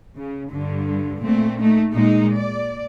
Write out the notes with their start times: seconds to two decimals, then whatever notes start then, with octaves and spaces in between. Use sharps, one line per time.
0.18 C#3
0.52 G2 D3
1.24 A#2 A3 C4
1.60 A3 D#4
1.92 A#2 G#3 D#4
2.36 D5